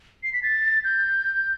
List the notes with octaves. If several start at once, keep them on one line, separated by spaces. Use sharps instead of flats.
C7
B6
A6
G6